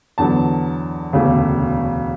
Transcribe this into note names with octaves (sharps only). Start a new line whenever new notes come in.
E2 D3 F#3 A5
E1 D2 C#3